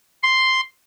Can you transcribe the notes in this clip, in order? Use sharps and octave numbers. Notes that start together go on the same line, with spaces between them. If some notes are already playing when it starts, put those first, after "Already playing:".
C6